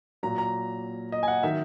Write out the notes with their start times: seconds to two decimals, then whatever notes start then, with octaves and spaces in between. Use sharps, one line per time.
0.23 A#2 F#3 A#5
0.38 A#5
1.12 D#5
1.23 G#5
1.28 F#5
1.43 D#3 F#3 E5